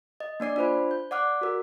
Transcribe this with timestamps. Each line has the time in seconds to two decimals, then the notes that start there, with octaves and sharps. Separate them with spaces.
0.20 D#5
0.40 A#3 D4 D5 C7
0.56 D4 F4 C5 B5
0.91 G6
1.11 D5 F#5 D6 F6 F#6
1.41 F#4 A#4